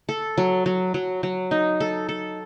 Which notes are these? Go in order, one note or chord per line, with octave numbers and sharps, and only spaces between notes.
A4
F#3
F#3
F#3
F#3
D#4
A4
A4